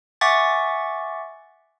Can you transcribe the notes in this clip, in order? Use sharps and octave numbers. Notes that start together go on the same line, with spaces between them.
E5 F#5 G#5 C#6 D6 A6